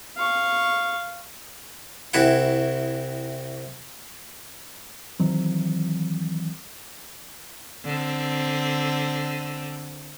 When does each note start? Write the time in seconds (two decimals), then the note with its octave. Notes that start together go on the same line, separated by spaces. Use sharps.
0.17 F5 C#6
2.14 C2 C4 E4 F#5
5.20 D#3 E3 F#3 C4
7.85 D3 C4